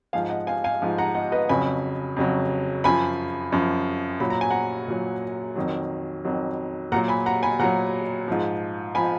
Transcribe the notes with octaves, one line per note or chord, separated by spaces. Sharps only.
G#2 F3 F5 G#5
D#5 F#5
F5 G#5
F5 G#5
G#2 F3
F#5 A#5
D#5 F#5
B4 D#5
F2 C#3 F#3 G#5 B5
F2 C#3 F#3
F#2 F3 G#5 B5
F#2 F3
A#2 F#3 B5
A#5
G#5
F#5 A#5
A#2 F#3
F2 D#3 F#3
F2 D#3 F#3
A#2 F#3 F#5 A#5
G#5 B5
F#5 A#5
G#5 B5
A#2 F#3 F#5 A#5
G#2 F3
F3 G#5 B5